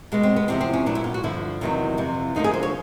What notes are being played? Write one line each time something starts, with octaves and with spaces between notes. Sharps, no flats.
B2 G#3 B3
C4
B3
E2 C3 F3 C4
C4
C#4
A#2 F#3 B3 D4
E4
F4
F#4
G2 D3 F3 E4
E2 C3 D#3 F#3 B3
F2 C3 E3
D2 D3 F3 A#3 D#4
G#4
C5
C#5